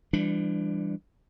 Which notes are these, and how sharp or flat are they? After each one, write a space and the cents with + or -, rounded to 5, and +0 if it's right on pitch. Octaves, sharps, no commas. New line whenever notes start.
E3 +35 G3 +25 D4 +0